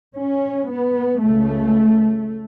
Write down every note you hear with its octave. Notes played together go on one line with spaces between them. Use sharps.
C#4
B3
C#2 C#3 A3